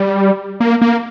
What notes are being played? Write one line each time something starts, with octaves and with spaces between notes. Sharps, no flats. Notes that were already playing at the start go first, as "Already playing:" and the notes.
Already playing: G3
A#3
A#3